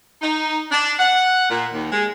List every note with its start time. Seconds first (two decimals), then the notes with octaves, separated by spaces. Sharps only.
0.22 D#4
0.71 D4
0.99 F#5
1.50 A#2
1.73 D#2
1.92 G#3